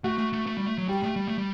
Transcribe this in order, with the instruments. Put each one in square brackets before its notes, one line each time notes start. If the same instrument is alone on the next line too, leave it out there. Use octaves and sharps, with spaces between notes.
[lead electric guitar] A3 [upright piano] F#4
[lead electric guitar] A3
A3
A3
G3
A3
F#3
[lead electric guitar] G3 [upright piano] G4
[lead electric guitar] A3
G3
A3
G3